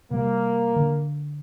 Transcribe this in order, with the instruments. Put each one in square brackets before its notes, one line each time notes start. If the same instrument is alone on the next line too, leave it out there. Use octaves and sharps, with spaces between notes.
[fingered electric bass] C3 G3 [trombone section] A#3
[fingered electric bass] D3